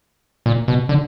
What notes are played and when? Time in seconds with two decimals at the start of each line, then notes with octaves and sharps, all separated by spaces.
0.46 A#2
0.68 B2
0.89 D3